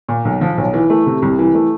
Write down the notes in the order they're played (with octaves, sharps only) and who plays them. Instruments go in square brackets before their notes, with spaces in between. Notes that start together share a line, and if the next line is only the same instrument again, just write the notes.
[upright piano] A#2
B1
F3
B1
E3
A3
C3
C2
E3
A3